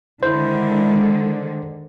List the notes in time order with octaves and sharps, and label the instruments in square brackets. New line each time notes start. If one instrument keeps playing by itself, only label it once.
[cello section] D3 D#3 G#3 [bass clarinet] E4 [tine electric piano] C5